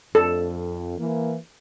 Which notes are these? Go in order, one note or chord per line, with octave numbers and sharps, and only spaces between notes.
F2 A4
E3 A#3